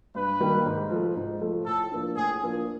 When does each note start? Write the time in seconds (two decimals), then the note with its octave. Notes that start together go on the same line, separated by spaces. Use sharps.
0.15 G2 B4
0.40 D#3 G3 A#3
0.66 G#2
0.91 F3 A3
1.16 G#2
1.41 F3 A3
1.66 A2 A4
1.91 F3 A#3 D4
2.16 A2 G#4
2.42 F3 A#3 D4